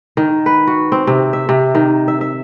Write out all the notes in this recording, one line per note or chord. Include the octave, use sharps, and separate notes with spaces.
D#3
B4
F#4
C4
C3
E5
C3
D#3
E5
E5